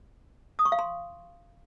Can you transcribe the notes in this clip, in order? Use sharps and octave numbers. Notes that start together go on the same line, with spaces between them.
D#6
C#6
F5
C6